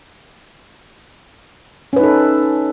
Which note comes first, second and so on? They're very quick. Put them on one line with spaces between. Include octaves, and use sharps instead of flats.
C#4 B4 D#4 A4